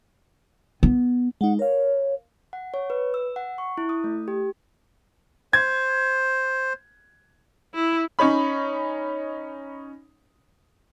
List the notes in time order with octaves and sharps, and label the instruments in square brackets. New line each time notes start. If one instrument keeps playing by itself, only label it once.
[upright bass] B3
[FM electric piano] G#3 D#4 [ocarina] F#5
[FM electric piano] A#4 F5 [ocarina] C#5
[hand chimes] F#5
C#5
B4
E6
F#5
C#6
E4
D#6
A3
G4
[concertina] C5 [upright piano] G#6
[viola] E4
[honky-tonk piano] C#4 D#4 C#5 B5